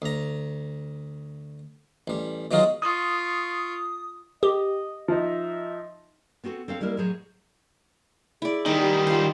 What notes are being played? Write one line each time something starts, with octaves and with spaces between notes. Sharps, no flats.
D2 A#5
A1 G3
B2 F#3 G#3 D#4 F4 F#4
F4 C#6 D#6
G4 D#5
F3 D#4 E5
B3 C4 F#4 G#4 A4
C4 A4 C#5 F5
G3 G#3 A#3 E4 A#4
A2 F#3 G#4 C5 C#5
E4 G#4 D5
D#3 G3 D#4
G4
F4 C5